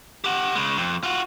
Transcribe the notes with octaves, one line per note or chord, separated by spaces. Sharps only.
G4 F#5
C#3 G#3
F2
F4 F#4